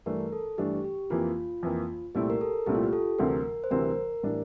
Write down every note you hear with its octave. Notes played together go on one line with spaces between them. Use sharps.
G2 E3 A3 D4 A#4
A4
G2 E3 A3 D4 G4
G4
F2 E3 A#3 F4
F2 E3 A#3
C2 A#2 A3 C4 E4 G4
A#4
A4
C2 A#2 A3 C4 E4 G4
F4
G4
A4
D2 C3 E3 G3 C4 A#4
C5
D2 C3 E3 G3 C4 A#4
A2 E3 G3 D4